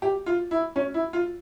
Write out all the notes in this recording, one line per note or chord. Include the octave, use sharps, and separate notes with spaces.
G4
F4
E4
C#4
E4
F4